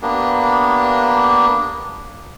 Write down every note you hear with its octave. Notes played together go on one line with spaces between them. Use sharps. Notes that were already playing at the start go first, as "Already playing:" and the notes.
A#3 B3 D4 G4